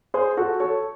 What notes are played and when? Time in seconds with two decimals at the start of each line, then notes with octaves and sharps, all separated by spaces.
0.14 G#4 C5
0.37 F#4 A4
0.60 A4 C#5